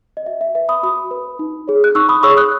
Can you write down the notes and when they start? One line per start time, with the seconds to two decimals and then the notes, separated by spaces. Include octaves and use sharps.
0.17 D#5
0.26 F#4 E5
0.41 E5
0.55 B4 E5
0.69 B5 D#6
0.83 F#4 B5 D#6
1.11 B4
1.39 D#4
1.68 G#4 C#5
1.84 F#6
1.95 D#4 C#6 E6
2.09 B5 D#6
2.23 G#4 C#5 C#6 E6
2.37 D#6 F#6